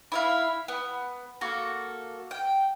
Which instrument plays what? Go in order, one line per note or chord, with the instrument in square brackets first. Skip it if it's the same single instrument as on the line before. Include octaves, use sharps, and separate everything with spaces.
[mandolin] E4 E5 F5
B3
A#3 F#4 A4
G5